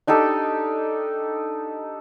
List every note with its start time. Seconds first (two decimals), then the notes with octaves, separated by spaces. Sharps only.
0.07 D4 D#4 G4 A4